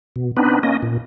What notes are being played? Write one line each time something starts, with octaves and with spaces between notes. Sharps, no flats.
B2
B3 C4 D4 D#4 B4
A#3 C#4 D#5
A#2